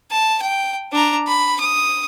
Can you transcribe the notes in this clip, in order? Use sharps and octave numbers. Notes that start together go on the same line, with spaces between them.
A5
G5
D4 A#5
B5
D#6